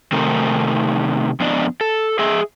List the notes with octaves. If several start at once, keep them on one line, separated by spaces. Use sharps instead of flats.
C3 D#3 A3 C4 D#4 A#4
F2 B3 D4 D5 D#5
A4
G#4 D#5 E5